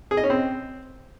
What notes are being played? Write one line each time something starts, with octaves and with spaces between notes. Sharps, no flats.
G#4
D#5
C#4
C4